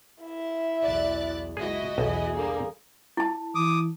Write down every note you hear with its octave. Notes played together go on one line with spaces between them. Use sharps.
E4 E5
B1 E2 D5 F#6 A6
F#1 C#2 E4 F#4 G#4 D#5
B1 E2 G#4 A5
D3 G3 A#3
E4 A5
E3 D6 D#6